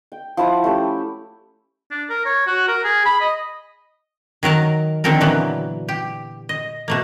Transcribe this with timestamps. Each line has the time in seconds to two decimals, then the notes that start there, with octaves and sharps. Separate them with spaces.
0.12 G5
0.37 F3 E4 F#5 D6
0.64 A3 C#4 G4
1.91 D4
2.10 A#4
2.26 C#5
2.47 F#4
2.68 A#4
2.84 G#4
3.05 B5
3.21 D#5
4.43 D#3 F#3 A#4 A5
5.04 D3 D#3 F3 C4 A4 A#4
5.20 A#2 D3 E3 F#3 B3
5.89 G4
6.49 D#5
6.88 B2 A3 A#3